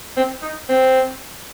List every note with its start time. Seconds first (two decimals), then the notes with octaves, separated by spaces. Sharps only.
0.17 C4
0.42 D#4
0.69 C4